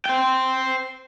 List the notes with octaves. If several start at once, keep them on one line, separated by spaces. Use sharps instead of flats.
C5 G5